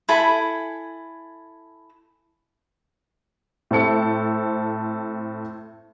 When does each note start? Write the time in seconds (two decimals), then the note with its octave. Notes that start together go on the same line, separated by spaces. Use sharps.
0.09 E4 A4 G#5 B5
3.71 A2 C4 A4 C#7